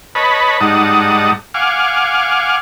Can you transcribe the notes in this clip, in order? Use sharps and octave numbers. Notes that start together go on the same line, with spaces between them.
B4 C#5 D#5 A5 B5
G#2 G3 D#4 F#5 A5 D#6
F5 F#5 G#5 D6 F6